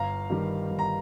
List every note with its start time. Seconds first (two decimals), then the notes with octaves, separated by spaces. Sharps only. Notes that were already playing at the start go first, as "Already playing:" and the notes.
Already playing: G1 F5 A#5
0.30 G2 D#3 G3
0.71 G1
0.79 A#5